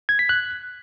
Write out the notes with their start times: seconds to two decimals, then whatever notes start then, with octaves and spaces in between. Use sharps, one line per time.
0.09 G#6
0.19 B6
0.29 F#6